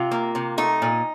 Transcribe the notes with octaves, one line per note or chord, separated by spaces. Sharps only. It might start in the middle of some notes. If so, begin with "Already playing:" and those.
Already playing: C3 F4
A#3
C3
A3 D#4
A#2